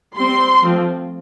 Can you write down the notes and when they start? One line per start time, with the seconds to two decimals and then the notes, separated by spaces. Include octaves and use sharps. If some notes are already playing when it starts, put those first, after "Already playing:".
0.17 G3 C4 C6
0.62 F3 A3 C4